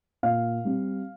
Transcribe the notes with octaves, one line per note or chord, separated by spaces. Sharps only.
A#2 F5
G3 C4